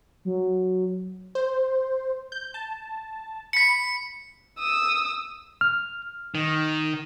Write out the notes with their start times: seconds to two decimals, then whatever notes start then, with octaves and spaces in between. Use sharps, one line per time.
0.25 F#3
1.35 C5
2.32 G6
2.54 A5
3.53 B5 B6 C#7
4.59 D#6 E6
5.61 F6
6.35 D#3